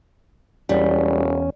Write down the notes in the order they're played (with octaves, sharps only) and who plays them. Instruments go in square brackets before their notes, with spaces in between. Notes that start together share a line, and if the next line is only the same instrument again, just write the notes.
[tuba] E1 [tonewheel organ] E2 C#4 [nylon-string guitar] G3